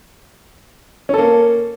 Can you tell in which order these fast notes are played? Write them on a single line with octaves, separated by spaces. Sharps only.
C#4 A4 A#3